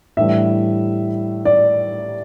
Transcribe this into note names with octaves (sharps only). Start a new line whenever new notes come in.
A2 E3 G3 D4 E5
D5